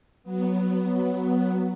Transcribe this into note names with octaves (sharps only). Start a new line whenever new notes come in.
F#3 B3